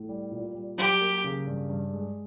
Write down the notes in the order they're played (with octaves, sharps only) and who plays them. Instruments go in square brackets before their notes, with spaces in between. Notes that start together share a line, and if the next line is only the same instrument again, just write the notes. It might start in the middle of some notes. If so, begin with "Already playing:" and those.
Already playing: [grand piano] A2
G3
A#2
G3
[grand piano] F#3 [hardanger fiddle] G4
[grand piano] A#3
C#3
G2
G2
G#3